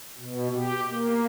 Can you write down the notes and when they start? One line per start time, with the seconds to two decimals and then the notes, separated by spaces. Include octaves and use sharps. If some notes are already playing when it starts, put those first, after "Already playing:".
0.18 B2
0.55 G4
0.88 A#3